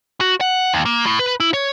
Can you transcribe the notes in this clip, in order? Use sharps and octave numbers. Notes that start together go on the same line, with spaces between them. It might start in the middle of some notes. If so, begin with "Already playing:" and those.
F#4
F#5
D#2
A#3
A2
B4
E4
C#5